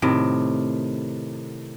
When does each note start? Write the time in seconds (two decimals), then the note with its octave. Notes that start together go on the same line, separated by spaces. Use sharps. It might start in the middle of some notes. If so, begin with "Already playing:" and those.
0.02 A2 C3 D#3